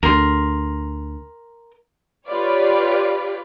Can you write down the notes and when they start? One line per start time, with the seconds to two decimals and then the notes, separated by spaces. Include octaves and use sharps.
0.03 D2 A#4 C6
2.27 F4 G4 B4 C#5 D5